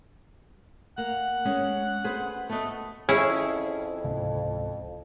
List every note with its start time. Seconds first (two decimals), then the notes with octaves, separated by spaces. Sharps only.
0.98 A#3 F#5
1.45 G#3 C#4
2.04 G#4 B4 C5
2.49 A3 B3 D#5
3.09 F2 C#4 E4 G#4
4.04 C#2 G#2 C3